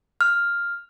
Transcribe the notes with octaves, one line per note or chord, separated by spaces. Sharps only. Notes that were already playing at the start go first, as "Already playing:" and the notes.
F6